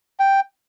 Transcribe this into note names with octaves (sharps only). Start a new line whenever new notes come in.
G5